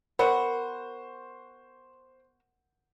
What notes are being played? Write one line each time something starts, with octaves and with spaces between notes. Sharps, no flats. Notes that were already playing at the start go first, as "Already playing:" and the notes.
B3 F#4 A#4 C5 F#5